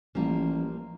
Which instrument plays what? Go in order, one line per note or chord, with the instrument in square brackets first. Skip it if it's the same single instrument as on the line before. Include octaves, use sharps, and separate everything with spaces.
[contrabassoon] A1 [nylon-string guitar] F3 G3 A#3